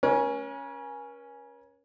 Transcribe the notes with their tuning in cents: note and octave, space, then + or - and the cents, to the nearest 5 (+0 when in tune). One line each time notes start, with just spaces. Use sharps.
C#4 +0 A#4 +45 G#5 +0